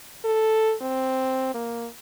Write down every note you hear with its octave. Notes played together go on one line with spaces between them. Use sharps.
A4
C4
A#3